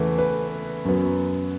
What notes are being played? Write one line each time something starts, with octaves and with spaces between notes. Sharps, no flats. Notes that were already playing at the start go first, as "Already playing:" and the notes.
Already playing: E2 C#3 E3 A3 E5
B4
F#2 F#3 B3